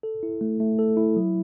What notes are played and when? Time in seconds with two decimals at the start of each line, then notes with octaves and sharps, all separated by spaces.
0.03 A4
0.23 E4
0.41 A3
0.60 A3
0.79 A4
0.97 E4
1.16 F#3